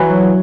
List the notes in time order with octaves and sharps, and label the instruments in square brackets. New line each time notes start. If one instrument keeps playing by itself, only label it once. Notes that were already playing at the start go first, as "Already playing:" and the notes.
Already playing: [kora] E3 D4 [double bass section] F#3